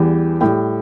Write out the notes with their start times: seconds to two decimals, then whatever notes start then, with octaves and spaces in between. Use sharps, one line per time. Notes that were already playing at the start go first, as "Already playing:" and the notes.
Already playing: E2 E3 G3 G5
0.41 A2 G3 G5